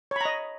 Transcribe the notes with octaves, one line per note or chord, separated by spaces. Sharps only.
C#5 D#5 A#5 B5